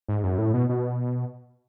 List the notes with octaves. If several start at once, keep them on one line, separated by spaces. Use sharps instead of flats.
G#2
F#2
A2
B2
B2